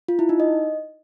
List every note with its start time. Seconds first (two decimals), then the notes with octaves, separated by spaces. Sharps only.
0.08 F4
0.19 E4
0.29 D#4
0.40 D#5